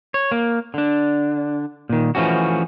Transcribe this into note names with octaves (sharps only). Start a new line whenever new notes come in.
C#5
A#3
D3 D4
A#2 D#3
E3 F3 A3 C#4 F#4